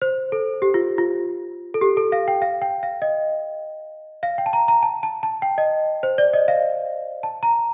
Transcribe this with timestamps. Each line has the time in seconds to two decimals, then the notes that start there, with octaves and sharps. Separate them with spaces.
0.02 C5
0.32 A4
0.62 G4
0.74 F4
0.98 F4
1.74 A4
1.81 G4
1.97 A4
2.12 F5
2.28 G5
2.42 F5
2.62 G5
2.83 F5
3.02 D#5
4.23 F5
4.38 G5
4.46 A5
4.53 A#5
4.68 A#5
4.83 A5
5.03 A5
5.23 A5
5.42 G5
5.58 D#5
6.03 C5
6.18 D5
6.33 D#5
6.48 F5
7.23 A5
7.43 A#5